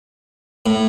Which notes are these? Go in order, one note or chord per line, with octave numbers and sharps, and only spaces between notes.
A2